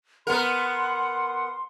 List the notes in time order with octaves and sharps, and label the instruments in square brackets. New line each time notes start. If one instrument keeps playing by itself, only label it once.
[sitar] B3 A#4 [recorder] F#5 [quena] C6